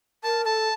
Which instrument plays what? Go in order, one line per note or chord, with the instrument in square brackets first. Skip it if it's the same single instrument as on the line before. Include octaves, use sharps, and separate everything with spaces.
[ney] A#4 [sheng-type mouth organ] A5
[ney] A4 [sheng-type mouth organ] A5